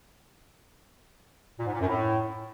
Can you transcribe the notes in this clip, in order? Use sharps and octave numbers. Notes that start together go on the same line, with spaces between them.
A#2
G#2
A#2
F#2
A2